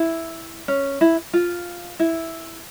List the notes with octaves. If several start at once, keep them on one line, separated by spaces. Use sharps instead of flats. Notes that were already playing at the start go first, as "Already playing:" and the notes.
Already playing: E4
C#4
E4
F4
E4